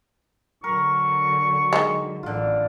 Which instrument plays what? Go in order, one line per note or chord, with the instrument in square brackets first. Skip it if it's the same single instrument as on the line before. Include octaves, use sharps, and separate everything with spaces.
[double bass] D3 F#3 [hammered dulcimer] A#4 [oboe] C#6
[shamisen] D#3 G#3
[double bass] A1 E3 [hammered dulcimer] D3 F4